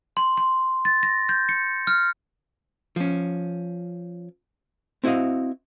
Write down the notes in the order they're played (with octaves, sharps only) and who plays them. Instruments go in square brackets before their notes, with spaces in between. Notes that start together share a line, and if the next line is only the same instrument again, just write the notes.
[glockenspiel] C6
C6
A6
A#6
G6
C#7
F6
[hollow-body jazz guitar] F3 C#4
C4 E4 F#4 C5 D#5 F5